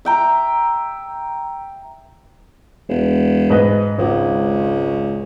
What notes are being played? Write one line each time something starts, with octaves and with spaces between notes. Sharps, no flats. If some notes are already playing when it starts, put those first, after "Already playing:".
E5 G5 A#5
E1
G#2 B4 D#5
G#1 C#2